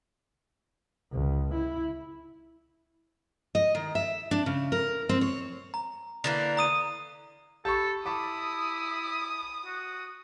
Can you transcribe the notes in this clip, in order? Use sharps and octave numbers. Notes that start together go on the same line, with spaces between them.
C#2
E4
D#5
D#3
E5
D4
C#3
A#4
C4
C#5
A#5
D3 E3 A#3
A#5 D#6 D#7
G4 A4 A5 B5 C#6
E4 A5 B5 D6 D#6
F#4